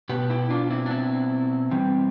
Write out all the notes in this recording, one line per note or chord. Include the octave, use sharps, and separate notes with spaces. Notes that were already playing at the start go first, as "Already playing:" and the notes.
B2 B3 G4 B4
E4 G4
D4 F4
C4 E4
D4
C4 E4
E3 G3 C4